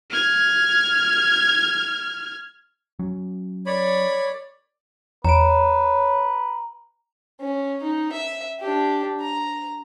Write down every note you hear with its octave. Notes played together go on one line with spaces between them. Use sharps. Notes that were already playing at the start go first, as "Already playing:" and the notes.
F6 G#6
F#3 C#4
C#5 D5 B5
E2 B4 C#5 A#5 D7
C#4
D#4
E5
D4 G4
A#5